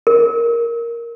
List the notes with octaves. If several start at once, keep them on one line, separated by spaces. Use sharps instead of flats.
A#4